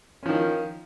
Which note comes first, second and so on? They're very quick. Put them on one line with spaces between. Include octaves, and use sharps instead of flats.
C#4 F3 D#3